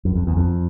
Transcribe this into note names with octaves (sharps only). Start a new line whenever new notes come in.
F#2
F2
E2
F2